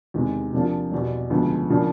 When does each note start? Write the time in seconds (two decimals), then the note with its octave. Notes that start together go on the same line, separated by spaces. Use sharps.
0.14 E2 C3 D#3 G#3
0.53 C3 F3 A#3 D4 F4
0.91 E2 B2 G3
1.30 D2 C#3 F3 G#3 B3
1.70 C#3 F3 A#3 D4